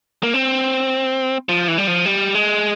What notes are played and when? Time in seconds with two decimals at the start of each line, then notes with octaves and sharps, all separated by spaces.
0.23 A#3
0.34 C4
1.49 F3
1.68 E3
1.78 G3
1.88 F3
2.06 G3
2.35 G#3